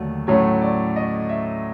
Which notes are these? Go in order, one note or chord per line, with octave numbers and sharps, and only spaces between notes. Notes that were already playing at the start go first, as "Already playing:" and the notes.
Already playing: D#2 D3 F#3 A3
A2 F#3 A3 C#4 C#5
D5
D#5
E5